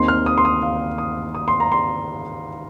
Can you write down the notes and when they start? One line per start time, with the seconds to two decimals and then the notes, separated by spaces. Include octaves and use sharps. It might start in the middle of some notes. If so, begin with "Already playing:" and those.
Already playing: D#2 D#3 C4 D#4 C6
0.08 F6
0.26 D#6
0.38 C6
0.45 D#6
0.62 F5
0.98 D#6
1.35 D#6
1.48 C6
1.60 A#5
1.72 C6